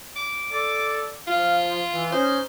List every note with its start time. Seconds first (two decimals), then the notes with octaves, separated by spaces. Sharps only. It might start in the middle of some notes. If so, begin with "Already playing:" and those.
0.16 D6
0.52 A4 D5
1.27 F3 F4 F5
1.72 C6
1.91 E3
2.12 C#4 D#4 C5